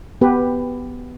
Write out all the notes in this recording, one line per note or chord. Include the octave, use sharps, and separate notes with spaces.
B3 G4 B4